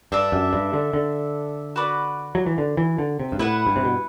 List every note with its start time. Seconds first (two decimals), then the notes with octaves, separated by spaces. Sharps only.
0.12 G2 D4 A4 E5
0.32 F#2
0.53 G2
0.73 D3
0.94 D3
1.76 F#4 B4 D5
2.35 F#3
2.46 E3
2.58 D3
2.77 E3
2.98 D3
3.20 C3
3.32 G2
3.39 A2 E4 B4 F#5
3.67 G2
3.76 C3
3.85 B2